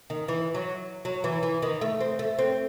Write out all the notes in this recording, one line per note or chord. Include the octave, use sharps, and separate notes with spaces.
D#3
E3
F#3
F#3
E3
E3
D#3
A3
C4
A3
C4